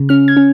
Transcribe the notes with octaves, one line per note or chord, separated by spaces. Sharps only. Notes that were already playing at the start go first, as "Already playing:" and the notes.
Already playing: C#3
C#4 F6
G#6
C#4